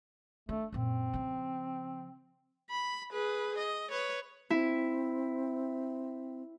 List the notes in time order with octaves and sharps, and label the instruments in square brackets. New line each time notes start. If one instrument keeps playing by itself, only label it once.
[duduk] A3 [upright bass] D4
[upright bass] F#2 A#2 [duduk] C4
[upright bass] C#3 F3
[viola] B5
G#4 B4
D#5
B4 C#5
[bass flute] C4 [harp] E4